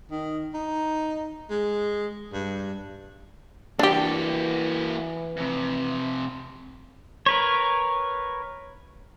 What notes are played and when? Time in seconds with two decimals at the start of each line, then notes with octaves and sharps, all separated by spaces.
0.11 D#3
0.54 D#4
1.50 G#3
2.33 G2
3.79 E3 A#3 D4 F#4 G4
5.37 F2 C3
7.26 A#4 B4 C#5